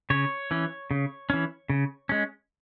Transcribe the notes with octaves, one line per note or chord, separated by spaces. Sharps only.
C#3 C#5
E3 C#4
C#3
E3 C#4
C#3
G#3 C#4